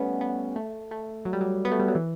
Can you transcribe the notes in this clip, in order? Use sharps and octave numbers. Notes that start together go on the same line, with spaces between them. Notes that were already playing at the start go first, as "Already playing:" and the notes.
Already playing: G3 A3 B3 C#4
B3
A3
A3
F#3
G3
F#3
B3
A3
G3
F#3
E3